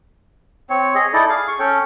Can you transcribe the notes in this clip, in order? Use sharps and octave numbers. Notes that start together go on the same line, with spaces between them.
C4 C#5
G#4 D#5
D#4 E4 A4 D5
G#4 F5
C#6
C#4 A4 C#5 G5